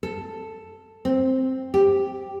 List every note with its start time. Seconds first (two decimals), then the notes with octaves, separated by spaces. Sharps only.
0.03 A4
1.05 C4
1.74 G4